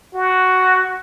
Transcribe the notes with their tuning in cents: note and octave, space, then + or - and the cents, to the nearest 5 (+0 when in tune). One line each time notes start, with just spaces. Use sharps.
F#4 +5